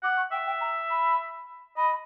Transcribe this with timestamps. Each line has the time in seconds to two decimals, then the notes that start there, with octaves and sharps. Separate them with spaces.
0.03 F#5 D6
0.17 C#6
0.32 E5 G5
0.46 G5
0.61 A#5
0.90 B5
1.77 D#5 B5